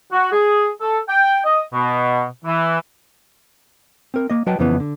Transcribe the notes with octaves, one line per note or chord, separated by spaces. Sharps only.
F#4
G#4
A4
G5
D#5
B2
E3
C4 A#4
A#3 D#5
F#3 F#4 B4 D#5 G5 A5
F2 C#3 E3 B3
D3